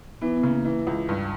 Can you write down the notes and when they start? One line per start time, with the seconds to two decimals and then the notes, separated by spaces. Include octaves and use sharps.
0.22 E3 B3
0.34 B3
0.43 C#3 A#3
0.65 E3
0.87 C#2
1.09 G2